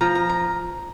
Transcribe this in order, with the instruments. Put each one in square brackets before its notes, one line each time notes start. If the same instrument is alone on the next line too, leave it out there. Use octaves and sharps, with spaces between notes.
[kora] F3 [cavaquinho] A#5
[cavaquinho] A#5
A#5